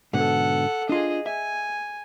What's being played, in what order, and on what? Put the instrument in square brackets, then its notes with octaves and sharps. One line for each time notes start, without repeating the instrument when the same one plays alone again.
[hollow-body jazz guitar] G#2 B2 D3 [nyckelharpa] A4 F#5
[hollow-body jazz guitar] D4 F4 [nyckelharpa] G#4 D#5
[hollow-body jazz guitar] E5 [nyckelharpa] G#5